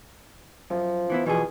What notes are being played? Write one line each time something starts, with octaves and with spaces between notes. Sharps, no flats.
F#2 F3
E3 B3 E4
B2 E3 F3 G#4